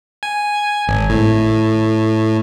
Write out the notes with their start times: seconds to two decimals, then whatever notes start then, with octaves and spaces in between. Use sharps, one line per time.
0.23 G#5
0.88 G#1
1.09 A2